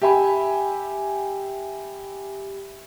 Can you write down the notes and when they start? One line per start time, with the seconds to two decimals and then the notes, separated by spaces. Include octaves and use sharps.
0.02 G4 E5 G#5 B5